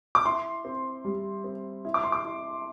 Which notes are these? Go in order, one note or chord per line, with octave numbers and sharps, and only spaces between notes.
D6
E4 C6
C4
G3
C4
E4
D6
C6
D6
E4